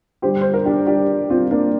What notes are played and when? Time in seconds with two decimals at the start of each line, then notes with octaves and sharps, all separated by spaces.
0.22 G2 D3 G3 G4 C5
0.41 C5
0.54 A#4
0.65 D4 G4
0.86 D4 G4
1.30 C4 F4
1.51 A#3 D4